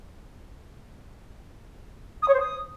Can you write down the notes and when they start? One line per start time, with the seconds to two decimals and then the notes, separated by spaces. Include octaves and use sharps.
2.22 D#6
2.28 C#5
2.34 C5
2.40 D#6